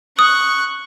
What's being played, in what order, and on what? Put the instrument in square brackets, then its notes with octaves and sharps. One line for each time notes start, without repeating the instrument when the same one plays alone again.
[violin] C#6 F#6 [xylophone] D#6